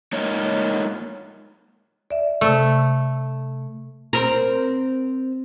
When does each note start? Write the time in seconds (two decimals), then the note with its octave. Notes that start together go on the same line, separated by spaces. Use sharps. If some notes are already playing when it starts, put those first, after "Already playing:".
0.13 G#3 A#3 D#4 C#5
2.11 D5 E5
2.41 C3 A3 A4
4.13 C4 A#4